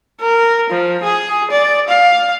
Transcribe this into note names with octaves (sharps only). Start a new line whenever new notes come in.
A#4
F3
G#4
D5
F5